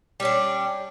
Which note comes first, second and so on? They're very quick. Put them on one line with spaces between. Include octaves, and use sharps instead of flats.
G3 C#4 D4